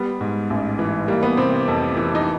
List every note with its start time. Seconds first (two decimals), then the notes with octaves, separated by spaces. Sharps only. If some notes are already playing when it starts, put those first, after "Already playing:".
Already playing: G3 B3
0.21 G#2
0.50 A1
0.79 E3
1.08 G3 A#3
1.23 B3
1.37 C3 C4
1.68 F2
1.97 E3
2.15 D#4